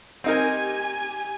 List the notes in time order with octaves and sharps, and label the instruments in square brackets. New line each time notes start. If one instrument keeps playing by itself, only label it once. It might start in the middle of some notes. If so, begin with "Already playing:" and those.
[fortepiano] C4 D#4 A#4 [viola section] G4 G#5